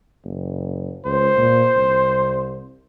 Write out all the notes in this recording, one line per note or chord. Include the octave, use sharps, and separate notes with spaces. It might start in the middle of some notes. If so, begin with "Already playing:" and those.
F#1
C#2 C5
A#2
C2